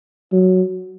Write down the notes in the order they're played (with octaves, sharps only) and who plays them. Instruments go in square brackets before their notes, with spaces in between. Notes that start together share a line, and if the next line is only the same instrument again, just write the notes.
[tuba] F#3